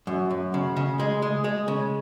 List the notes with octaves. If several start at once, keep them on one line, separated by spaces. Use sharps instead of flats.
F#2
F#2
C#3
C#3
G#3
G#3
G#3
C#3